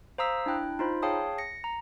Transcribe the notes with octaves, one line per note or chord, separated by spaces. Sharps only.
C5 F5 A#5 D#6 E6 B6
D4 E4 G5 F#6
D#4 F4 C5 B5
G#4 C#5 F5 G5 A5 D#6
A#6 C#7
A#5